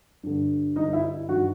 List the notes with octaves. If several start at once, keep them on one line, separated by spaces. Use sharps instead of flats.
G2 D3
G2 D3 D#4 D#5
E4 E5
G2 D#3 F#4 F#5